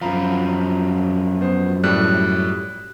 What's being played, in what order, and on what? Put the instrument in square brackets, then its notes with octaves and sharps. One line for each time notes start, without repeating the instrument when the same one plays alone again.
[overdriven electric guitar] F#2 F3 [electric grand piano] F5 A#5 B5
[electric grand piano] B3 C5
[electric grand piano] A2 G3 [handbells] F#6